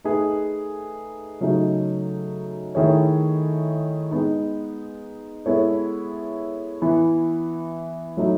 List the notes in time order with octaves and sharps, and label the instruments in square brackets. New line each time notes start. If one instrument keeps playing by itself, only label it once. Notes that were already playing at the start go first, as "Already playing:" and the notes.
[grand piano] A3 D#4 G#4 B4
C#3 F#3 A3 D#4
D#3 A3 E4 G#4 C#5
G#3 B3 D#4
G#3 B3 E4 A4 C#5
E3 B3 E4
F#3 A3 D#4